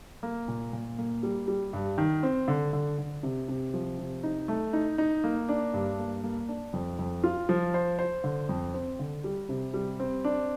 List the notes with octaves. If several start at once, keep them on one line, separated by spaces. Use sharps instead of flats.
A#3
A#2
A#2
A#3
G3
G3
G2
D#3
C4
D3
D3
D3
C3
C3
F3
C3
D#4
A3
D#4
D#4
A#3
D4
G2
A#3
A#3
D4
F2
F2
F4
F3
C5
C5
D3
F2
C4
D3
G3
C3
G3
C4
D4